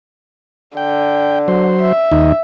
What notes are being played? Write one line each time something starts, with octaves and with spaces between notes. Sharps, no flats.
D3 G5
F#3 C5
E5
D#2 D#4